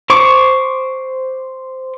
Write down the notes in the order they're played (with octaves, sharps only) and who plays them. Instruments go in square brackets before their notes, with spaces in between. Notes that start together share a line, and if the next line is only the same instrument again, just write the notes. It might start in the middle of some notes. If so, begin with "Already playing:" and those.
[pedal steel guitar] C5 C#6 D6